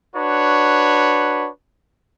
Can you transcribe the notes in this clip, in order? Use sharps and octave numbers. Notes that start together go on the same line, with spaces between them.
D4 F#4 B4 C#5